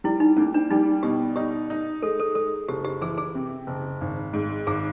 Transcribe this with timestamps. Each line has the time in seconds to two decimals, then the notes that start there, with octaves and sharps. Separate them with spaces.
0.04 G3 E4
0.20 D#4
0.37 A#3 C#4
0.54 D4
0.71 G3 D#4
1.03 B2 G4
1.36 D#4 G4
1.70 D#4
2.03 G#3 A4
2.20 A4
2.35 G#3 A4
2.69 F#1 G4
2.85 G4
3.01 E3 G#4
3.18 G#4
3.35 C3
3.67 F#1
4.01 G#1
4.33 G#2
4.67 G#1 G#4